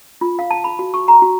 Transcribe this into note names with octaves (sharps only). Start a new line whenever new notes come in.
F4
F5
A5
B5
F#4
C#6
A#5
F#4